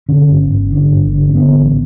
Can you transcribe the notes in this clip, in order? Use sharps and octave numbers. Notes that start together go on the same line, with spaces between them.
D3 C#4
G1
G1
D3
G1
D3
C#4
D3 B3
A1